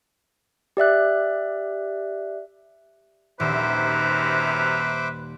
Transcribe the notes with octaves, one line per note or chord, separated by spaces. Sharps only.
G4 D5 E5 F#6
D#1 F#2 C3 B4 C5 E5 A#5 D6